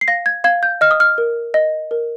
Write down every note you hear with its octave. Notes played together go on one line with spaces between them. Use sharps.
C7
F5 A#6
G#6
F5 G#6
G6
D#5 F6
D#6
F6
A#4
D#5
A#4